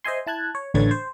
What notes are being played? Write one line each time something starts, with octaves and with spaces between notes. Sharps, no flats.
C5 D#5 E5 G#5 C6
E4 A5 F#6 G#6
C#5
A1 D3 B4 C#5 G#6 A6
C5